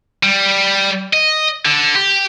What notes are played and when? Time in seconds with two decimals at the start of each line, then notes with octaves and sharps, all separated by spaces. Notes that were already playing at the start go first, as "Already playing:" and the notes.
0.23 G3
1.13 D#5
1.66 D3
1.96 G4